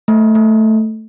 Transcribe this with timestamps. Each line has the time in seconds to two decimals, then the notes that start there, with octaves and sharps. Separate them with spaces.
0.08 A3
0.35 A3